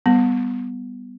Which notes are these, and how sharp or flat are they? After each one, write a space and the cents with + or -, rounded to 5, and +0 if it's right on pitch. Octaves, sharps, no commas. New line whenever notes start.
G3 +0 B3 +0